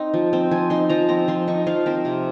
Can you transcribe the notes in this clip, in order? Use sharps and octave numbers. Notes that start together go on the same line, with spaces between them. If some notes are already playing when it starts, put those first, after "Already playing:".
Already playing: C4 D#4
F3
C4
F3 G#5
D#4 C6
F3 A#5
C4 A#5
F3 C6
D#4 C#6
F3 F5
C4 A#4
C3